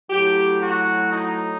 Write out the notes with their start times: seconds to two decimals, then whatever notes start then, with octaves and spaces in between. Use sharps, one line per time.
0.10 A2 F#3 G4
0.61 F#4
1.13 D#4